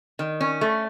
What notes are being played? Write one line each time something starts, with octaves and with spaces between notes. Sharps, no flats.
D#3
C#4
A3